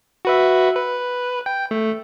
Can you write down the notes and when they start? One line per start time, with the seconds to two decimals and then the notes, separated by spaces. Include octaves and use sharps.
0.25 F#4 B4 E5
0.76 B4
1.46 G5
1.71 A3